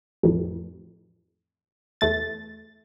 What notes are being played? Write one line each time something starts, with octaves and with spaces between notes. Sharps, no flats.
A1 F2 A2
E2 A3 A6